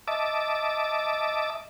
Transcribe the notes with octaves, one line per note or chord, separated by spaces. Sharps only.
D#5 E5 A5 D6